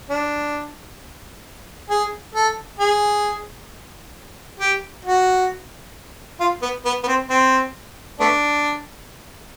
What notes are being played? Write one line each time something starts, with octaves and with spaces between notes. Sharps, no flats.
D4
G#4
A4
G#4
G4
F#4
F4
B3
B3
B3
C4
C4
A3 B3 D4